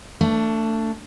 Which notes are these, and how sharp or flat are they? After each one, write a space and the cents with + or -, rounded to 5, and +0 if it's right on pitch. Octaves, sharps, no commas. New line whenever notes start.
A3 +25 D4 +0